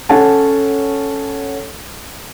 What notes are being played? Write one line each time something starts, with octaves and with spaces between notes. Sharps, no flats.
C#4 A4 C#5 F#5 G#5 A5